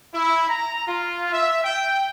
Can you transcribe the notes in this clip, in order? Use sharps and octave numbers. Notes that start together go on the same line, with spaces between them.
E4
A#5
F4
E5
G5